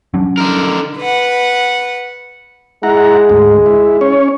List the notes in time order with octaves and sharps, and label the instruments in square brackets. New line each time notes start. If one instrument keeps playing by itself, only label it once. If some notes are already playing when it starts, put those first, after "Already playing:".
[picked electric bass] F#3 C#4 D4
[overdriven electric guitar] D3 A#4
[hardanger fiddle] B4 F#5
[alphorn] G#3 [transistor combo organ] E4 F#5 A#5
[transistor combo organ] D2 G#2
E4
C#4 C#5